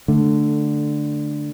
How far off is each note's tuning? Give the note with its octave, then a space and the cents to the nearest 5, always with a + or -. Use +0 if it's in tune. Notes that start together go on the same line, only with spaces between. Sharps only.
D3 +10 A3 +0